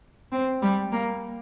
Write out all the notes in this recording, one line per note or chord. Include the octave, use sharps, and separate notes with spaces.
C4
G3
A#3